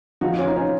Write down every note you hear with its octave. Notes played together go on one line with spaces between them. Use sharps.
F3 D#4 F#4
C#4 F4
D#4
C#4 F4